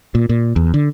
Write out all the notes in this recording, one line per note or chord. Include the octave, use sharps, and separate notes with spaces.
A#2
A#2
E2
D3